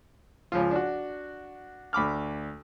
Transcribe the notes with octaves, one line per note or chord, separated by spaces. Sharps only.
C#2 F3 F4
D4 F#4
D2 B5 D6 F6